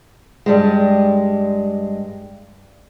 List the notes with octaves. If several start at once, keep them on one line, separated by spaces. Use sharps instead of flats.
G2 G3 G#3